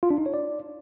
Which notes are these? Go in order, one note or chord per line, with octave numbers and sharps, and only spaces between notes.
F4
D4
D#4
C#5
D5